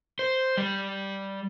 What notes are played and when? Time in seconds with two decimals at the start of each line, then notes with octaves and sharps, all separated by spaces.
0.19 C5
0.57 G3